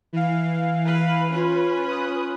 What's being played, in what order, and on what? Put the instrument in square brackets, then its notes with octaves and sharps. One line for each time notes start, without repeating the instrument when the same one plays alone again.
[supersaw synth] E3 F5
[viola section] B4
C#4 F4 B4
[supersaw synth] D#6 F#6